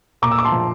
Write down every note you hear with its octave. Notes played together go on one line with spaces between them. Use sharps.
A#2 A#5 D6
E6
D6
A5 C6
F3